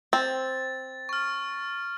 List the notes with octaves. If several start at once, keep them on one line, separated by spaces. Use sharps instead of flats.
C4 A6
C#6 F6